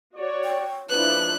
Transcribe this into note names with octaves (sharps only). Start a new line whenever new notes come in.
F#4 C#5 D5
G5
A#2 C#3 F3 G#3 D4 E4 B4 F#6